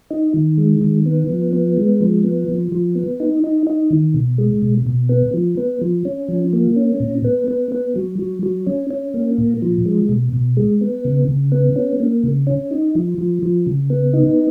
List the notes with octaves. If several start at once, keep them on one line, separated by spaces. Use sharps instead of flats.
D#4
D#3
G#3
D#3
B3
F3
B3
G#3
F3
B3
F3
F3
B3
D#4
D#4
D#4
D#3
B2
G#3
B2
B2
B3
F3
B3
F3
C#4
F3
A#3
C#4
A#2
B3
B3
B3
F#3
F#3
F#3
C#4
C#4
A#3
A#2
F3
G#3
B2
B2
G#3
B3
C#3
C#3
B3
C#4
A#3
C#3
C#4
D#4
F3
F3
F3
C#3
B3
D#4